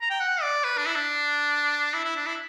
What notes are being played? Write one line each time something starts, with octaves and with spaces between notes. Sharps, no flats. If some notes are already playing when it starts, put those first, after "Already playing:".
A#5
G5
F#5
D5
B4
D4
E4
D4
E4
E4
D4
E4